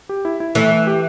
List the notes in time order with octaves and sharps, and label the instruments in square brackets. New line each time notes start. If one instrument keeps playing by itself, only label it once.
[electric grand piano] G4
E4
E4
[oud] E3 [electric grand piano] A3
[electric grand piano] A3
G4